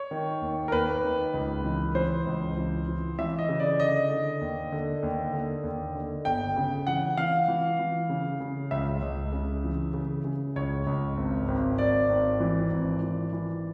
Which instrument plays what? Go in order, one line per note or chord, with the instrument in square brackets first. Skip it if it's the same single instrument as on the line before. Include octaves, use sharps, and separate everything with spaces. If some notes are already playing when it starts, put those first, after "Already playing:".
Already playing: [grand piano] C#5
D#3
D#2
A#4
D#2 B4
D#3
C#2
E3
E3 C5
C#2
E3
E3
E3 E5
D#5
C#3
D5
D3 D#5
D3
D#2
D3
D#2
D3
D#2
D3
G1 G5
C#3
E3 F#5
E3 F5
E3
E3
C#3
C#3
C#2 E5
C#2
C#3
E3
C#3
C#3
C#2 C#5
C#2
G#1
G#1
G#1 D5
G#1
E3
G#1
E3
E3